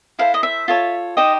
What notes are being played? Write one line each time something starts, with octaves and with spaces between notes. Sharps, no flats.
E4 A4 C5 F5
D#5
E5
F4 A4 C#5
D#4 G4 C5 D#5